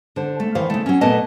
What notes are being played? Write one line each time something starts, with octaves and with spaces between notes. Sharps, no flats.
D3 C5
A3
D#3 E3 C5 F5
C#3 A3
F#3 C#4
A#2 A3 B3 D#5 A5